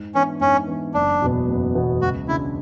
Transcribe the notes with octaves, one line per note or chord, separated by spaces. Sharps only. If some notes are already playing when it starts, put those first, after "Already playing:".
Already playing: G#2
E3 B3 C#4 D4
G#2 C#4
E3 B3 D4
F#1 D4
E2 B2 F#3 B3
F#1
E2 B2 F#3 B3
C#2 F#4
C#3 G#3 D4 E4